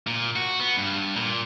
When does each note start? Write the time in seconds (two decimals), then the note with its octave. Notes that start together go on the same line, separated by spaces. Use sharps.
0.07 A#2
0.36 F#4
0.60 B3
0.78 G2
1.16 A#2